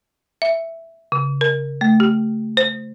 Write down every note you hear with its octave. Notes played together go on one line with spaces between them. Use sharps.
E5
C#3
A#4
A3
G4
C5